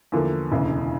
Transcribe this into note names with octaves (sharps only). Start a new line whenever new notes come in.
E2 D3 F3 A#3
E1 D2 C#3 E3